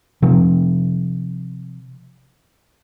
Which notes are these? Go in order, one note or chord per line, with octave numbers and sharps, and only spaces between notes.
C3 F3